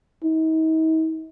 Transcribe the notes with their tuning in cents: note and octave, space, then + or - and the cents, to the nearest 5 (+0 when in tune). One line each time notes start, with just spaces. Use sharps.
D#4 +45